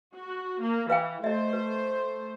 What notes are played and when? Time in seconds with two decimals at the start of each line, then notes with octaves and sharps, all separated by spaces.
0.15 F#4
0.61 A#3
0.90 E3 B4 F5 G5
1.24 A3 C5 D#5 E5
1.53 B4